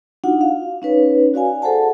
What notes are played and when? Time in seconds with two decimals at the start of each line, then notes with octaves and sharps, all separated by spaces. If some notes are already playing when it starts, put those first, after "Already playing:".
0.24 D4 D#4 F4 F#4 F#5
0.41 F5
0.82 C#4 D#4 B4 C#5
1.34 F#4 D5 F5 G#5
1.62 G#4 A4 C5 F#5 A5